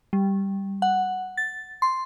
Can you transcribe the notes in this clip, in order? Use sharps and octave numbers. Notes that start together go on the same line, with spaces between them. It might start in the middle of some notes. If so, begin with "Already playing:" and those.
G3
F#5
A6
C6